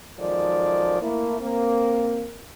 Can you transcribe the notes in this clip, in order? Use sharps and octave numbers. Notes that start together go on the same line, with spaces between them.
F#2 D#3 F3 G#3 A4 D5
A3 A#3 E4
A#3 C4